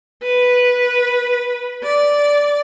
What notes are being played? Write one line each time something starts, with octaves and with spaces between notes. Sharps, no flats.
B4
D5